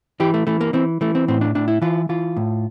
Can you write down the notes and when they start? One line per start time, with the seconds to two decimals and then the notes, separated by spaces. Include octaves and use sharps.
0.20 E3 G4
0.34 A3
0.47 E3 A3
0.61 A#3
0.73 E3 C4
1.01 E3 A3
1.15 C4
1.28 A2 C4
1.41 D4
1.55 A2 D4
1.68 E4
1.82 E3 F4
2.09 E3 F4
2.37 A2